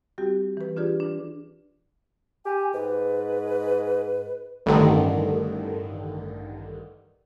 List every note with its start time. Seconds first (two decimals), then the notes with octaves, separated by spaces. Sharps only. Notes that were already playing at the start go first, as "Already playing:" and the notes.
0.18 G3 C4 F#4 G4
0.57 E3 B4
0.77 D4 F4 G4 G#4 B4 D5
1.00 D4
2.45 G4 G#5
2.74 G#2 B4
4.66 A1 G2 D3 D#3